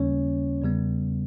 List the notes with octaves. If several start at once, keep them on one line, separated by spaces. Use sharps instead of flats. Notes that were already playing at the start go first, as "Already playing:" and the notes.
Already playing: D#2 C#3 G3 A#3 C#4 C#5
E2 C#3 G3 B3